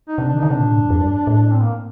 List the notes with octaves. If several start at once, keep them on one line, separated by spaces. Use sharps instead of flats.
D#4
C3 D4
D4
D#3
D3 D#4
C3 D4
A#2
A2
G2
F2
G2
A2
D4
C4
A#3